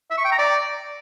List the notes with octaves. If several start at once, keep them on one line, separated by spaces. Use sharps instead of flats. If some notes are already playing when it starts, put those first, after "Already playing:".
E5
C#6
G5
A#5
D5